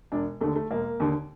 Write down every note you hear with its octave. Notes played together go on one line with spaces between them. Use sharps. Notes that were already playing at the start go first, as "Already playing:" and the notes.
E1 D4
D#2 D3 A3
A3
E1 A#3
D#2 D3